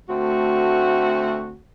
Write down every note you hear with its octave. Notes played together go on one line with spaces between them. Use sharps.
D2 A3 C4 F#4